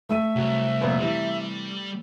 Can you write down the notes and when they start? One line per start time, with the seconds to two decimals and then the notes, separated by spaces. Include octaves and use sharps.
0.09 A3 E5 E6 D#7
0.36 C2 F#3
0.81 F2 A#2 B3
0.99 C3 E3 G3